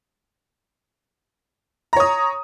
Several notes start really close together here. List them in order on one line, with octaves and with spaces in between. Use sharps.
A#5 C#5 D#6